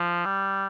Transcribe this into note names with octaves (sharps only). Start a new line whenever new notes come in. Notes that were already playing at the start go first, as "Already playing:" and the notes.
Already playing: F3
G3